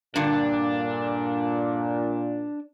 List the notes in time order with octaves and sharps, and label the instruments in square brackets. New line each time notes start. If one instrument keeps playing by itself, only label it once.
[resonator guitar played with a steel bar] G2 D3 [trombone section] A#2 [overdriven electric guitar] D4